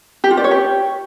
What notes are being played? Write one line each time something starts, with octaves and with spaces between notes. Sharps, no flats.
G4
F4
D5
C#5
G4